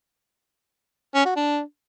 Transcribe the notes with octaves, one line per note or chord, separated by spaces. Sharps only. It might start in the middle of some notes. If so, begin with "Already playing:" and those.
C#4
F#4
D4